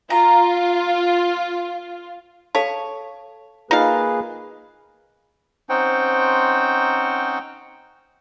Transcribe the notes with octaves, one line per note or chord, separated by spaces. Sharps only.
F4 A#5
A4 C#5 F5 A5
A#3 D#4 F4 G#4 B4 D#5 F5
C4 C#4 D#4 C5 F#5 G5